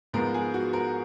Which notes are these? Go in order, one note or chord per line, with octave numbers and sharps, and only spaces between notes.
G#2 F3 G#3 B3 A#4
G#4
F#4
A#4